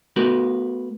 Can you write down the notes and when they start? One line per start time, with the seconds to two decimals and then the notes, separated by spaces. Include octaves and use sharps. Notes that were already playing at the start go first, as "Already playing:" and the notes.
0.16 A3 B3 F#4 A#4 B4